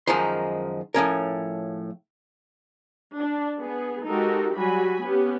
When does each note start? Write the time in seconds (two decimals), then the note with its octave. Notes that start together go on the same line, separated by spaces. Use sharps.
0.07 F#2 D#3 F3 G#3 D#4 C6
0.94 A2 F3 C#4 A#4
3.17 D4
3.60 B3 G#4
4.06 G#3 D#4 F#4 G4 A4 A#4
4.55 F#3 G3 F#4 G#5 B5
5.04 B3 C#4 G4